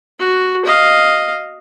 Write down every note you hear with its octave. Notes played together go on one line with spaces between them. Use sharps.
F#4
D#5 F5